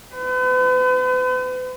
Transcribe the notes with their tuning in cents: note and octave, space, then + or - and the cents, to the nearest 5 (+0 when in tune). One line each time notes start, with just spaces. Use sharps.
B4 +45